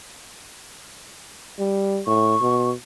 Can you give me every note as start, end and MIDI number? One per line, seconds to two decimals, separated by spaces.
1.59 2.02 55
2.07 2.36 45
2.07 2.70 85
2.41 2.73 47